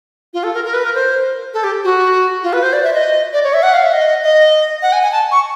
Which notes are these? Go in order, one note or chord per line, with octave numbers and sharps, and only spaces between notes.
F4
A4
A#4
A#4
B4
A#4
C5
A4
G4
F#4
F4
B4
C5
D5
E5
D#5
D5
C#5
E5
F#5
F5
E5
D#5
D#5
F#5
G#5
G#5
A5
C#6